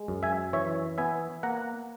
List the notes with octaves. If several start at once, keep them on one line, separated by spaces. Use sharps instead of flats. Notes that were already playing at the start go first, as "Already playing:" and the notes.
Already playing: G#3
F#2
E5 G#5
E3 C#5 E5
B3 E5 G#5
A#3 F#5 A#5